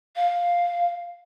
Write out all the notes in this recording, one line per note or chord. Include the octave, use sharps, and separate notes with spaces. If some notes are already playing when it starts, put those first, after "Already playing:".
F5